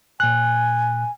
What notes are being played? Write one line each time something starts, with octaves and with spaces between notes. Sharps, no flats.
A#2 G#5 F#6